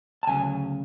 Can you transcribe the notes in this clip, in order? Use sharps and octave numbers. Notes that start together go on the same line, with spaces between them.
A5
D2 C#3 F#3 G#5